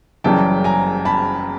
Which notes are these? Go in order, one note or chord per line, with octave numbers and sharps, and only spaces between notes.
F#1 F#2 C#3 E3 G3 G5 A5
G#5 A#5
A5 B5